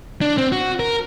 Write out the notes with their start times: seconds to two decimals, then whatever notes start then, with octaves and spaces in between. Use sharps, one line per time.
0.21 D4
0.38 C4
0.52 F#4
0.80 A#4